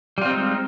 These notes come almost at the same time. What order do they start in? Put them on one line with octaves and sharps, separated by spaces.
G3 F4 C4 D#4 G#3